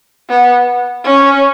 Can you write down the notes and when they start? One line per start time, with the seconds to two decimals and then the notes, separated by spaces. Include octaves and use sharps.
0.29 B3
1.04 C#4